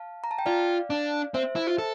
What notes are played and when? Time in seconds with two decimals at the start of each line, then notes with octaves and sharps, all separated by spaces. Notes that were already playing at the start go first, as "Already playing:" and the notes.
Already playing: F5 A5
0.24 A#5
0.31 A5
0.39 G5
0.46 F4 D5 F5
0.90 D4
1.34 C4 C5 E5
1.56 E4
1.67 F4
1.78 A4